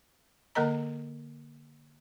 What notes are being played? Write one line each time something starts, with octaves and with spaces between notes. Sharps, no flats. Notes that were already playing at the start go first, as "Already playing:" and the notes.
D3 A#3 A#4 D#5 A#5